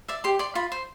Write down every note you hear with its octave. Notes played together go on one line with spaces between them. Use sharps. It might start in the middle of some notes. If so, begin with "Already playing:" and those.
D5 E5
G4 C6
D5 C6
F4 B5
C5